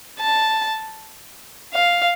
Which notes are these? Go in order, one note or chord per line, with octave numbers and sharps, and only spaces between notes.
A5
F5